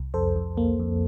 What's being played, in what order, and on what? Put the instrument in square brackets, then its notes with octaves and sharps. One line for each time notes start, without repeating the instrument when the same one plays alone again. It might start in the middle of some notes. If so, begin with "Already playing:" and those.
Already playing: [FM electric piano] C2
F2 A4 C5
F2
A#3
F2